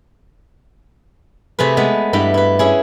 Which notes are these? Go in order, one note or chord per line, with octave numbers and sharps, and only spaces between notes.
C3 A3 G#4 B4
G#3 A3 B3
G2 E4 G4 B4
E4 B4
C#4 E4 G#4